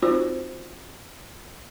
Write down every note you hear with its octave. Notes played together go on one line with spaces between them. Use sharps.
C4 D#4 F4 F#4 C5